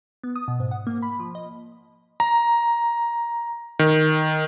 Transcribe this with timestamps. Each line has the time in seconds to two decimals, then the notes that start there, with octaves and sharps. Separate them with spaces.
0.24 B3
0.36 D#6
0.48 B2
0.60 G#2
0.71 F#5
0.87 A#3
1.02 B5
1.20 F3
1.35 D#5
2.20 A#5
3.79 D#3